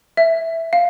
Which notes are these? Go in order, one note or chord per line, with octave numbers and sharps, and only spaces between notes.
E5
F5